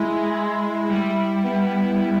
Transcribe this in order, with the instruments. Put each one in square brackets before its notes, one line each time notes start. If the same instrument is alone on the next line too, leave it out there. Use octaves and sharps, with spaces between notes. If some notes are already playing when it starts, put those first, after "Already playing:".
Already playing: [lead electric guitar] G#3 [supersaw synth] E4
[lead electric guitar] G3 [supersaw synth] E4
[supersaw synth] B3